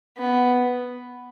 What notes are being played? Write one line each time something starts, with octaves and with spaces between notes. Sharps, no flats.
B3